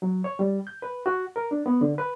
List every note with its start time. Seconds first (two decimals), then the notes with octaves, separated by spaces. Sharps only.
0.02 F#3
0.24 C#5
0.39 G3
0.67 G6
0.82 B4
1.06 F#4
1.36 A#4
1.51 D4
1.66 B3
1.81 D3
1.98 B4